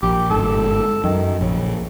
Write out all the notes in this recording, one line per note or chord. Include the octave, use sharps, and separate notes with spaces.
A#1 G4
G1 G#2 A4
F#2 D#3
A#1 C#3